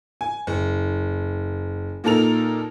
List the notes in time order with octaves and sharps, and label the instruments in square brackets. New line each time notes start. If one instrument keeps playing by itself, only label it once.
[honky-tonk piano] G#5
F#1
A#2 A#3 D#4 A4 A#4 F7